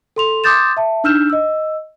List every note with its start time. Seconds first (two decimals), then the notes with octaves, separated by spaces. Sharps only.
0.16 A4 C6 F7
0.44 C6 D6 D#6 G6 A6 E7
0.77 E5 A5
1.04 D4 D#4 E6 F6 G6 E7
1.30 D#5 E6